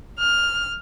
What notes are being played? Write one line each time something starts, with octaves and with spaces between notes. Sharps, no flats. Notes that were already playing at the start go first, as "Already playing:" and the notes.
F6